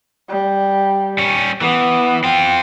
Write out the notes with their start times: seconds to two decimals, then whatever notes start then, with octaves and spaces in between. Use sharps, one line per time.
0.29 G3
1.18 G3 C#4
1.61 E3 B3
2.24 C4 F4 G5